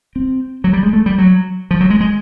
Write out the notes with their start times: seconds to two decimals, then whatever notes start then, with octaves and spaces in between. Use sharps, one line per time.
0.16 C4
0.64 F#3
0.73 G3
0.83 G#3
0.93 A3
1.06 G3
1.18 F#3
1.71 F3
1.81 F#3
1.90 G#3
2.01 G#3